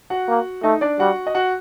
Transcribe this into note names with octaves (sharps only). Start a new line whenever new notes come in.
F#4 F#5
A#3
A3 D#4 D#5
D4 D5
G3 F#4 F#5
D#5
F#4 F#5